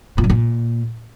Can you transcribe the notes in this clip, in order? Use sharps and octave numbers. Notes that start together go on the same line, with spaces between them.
A#2
F#2
A#2